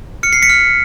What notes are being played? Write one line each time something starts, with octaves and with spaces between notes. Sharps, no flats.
F6 C#7
C7
B6 C#7
F6